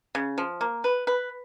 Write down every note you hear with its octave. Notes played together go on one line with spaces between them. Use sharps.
C#3
F3
A#3
B4
B4